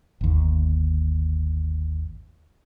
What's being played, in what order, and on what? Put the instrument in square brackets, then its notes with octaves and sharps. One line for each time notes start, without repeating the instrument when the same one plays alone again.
[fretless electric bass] G1 D#2